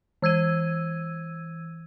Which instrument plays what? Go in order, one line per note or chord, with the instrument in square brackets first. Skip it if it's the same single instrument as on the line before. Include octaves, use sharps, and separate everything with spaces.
[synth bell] E3 E6 G#6 D#7